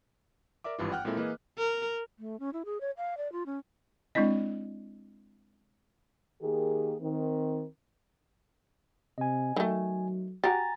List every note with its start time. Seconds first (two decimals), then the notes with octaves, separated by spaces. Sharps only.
0.64 A#4 D5 E5 D6
0.79 G#1 G2 E3 F4
0.92 F#5 G5 F6 F#6
1.05 A#2 G#3 C4 E4 A4 A#4
1.16 E3 A#3 G#4 B4 D#5
1.59 A#4
2.19 A3
2.40 C#4
2.53 E4
2.65 G#4
2.81 C#5
2.97 F5
3.17 D5
3.32 F4
3.46 C#4
4.15 G#3 C4 D4 E4 D#5
6.42 D#3 A#3 G4 G#4
7.00 D#3 C4
9.18 C3 D#5 G#5
9.56 D#3 F#3 A3
10.44 F#4 G4 G#5 A#5 A6